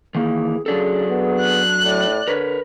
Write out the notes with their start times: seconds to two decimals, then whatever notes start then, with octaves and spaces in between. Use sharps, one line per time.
0.15 D#3 E3 A#3 G#4
0.66 C#3 F#3 D4 G#4 A4
1.10 B3
1.40 F#6
1.84 A2 D5
2.28 D3 A#4 B4 C#5